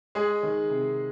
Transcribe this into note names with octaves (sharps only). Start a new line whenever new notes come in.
G#3 G#4
D#3
C3